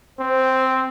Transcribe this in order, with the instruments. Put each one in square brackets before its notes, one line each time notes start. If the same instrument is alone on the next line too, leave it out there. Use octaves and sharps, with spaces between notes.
[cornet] C4 [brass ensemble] C5